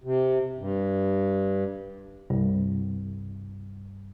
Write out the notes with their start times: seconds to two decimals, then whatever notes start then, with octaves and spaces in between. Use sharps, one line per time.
0.04 C3
0.59 G2
2.30 C2 G2 G3